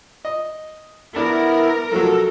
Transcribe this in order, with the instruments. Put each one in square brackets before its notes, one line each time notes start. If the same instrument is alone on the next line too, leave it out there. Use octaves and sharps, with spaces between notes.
[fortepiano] D#5
[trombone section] B3 E4 [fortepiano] D4 [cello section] A#4
[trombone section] C#2 C3 F#4 [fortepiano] F3 F#3 [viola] A4